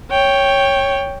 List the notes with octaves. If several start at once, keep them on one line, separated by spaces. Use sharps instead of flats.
C#5 G5